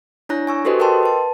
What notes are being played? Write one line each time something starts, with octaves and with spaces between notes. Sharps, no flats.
D4 E4 C#5 A#5 F#6 A#6
G#5 C#6 E6
F#4 G4 A4 B4 C5 D#5
A#4 D#5 G5 A5 C6
B4 A5